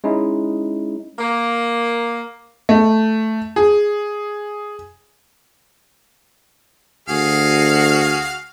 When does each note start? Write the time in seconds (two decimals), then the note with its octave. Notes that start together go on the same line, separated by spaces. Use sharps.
0.04 G#3 C#4 D#4 E4
1.18 A#3
2.69 A3
3.56 G#4
7.09 D2 F#4 G#4 F5